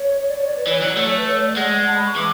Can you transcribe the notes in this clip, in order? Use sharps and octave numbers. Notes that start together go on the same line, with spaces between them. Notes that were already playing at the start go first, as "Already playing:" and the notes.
Already playing: C#5
D5
C#5
D5
B4
E3 C#5
F#3
A3 C#5
C#5
B4
C#5
C#5
D5
G#3 F#5
A5
B5
C#6
E3 D6